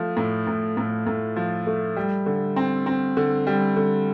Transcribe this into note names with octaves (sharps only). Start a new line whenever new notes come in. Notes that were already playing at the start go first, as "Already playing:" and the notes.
Already playing: F3 A3
A2
A2
A2
A2
F3
A3
G3
D3
C4
C4
D3
G3
D3